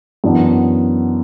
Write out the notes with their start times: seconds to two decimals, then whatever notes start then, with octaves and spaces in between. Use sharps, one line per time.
0.24 F#2 E3 B3 D4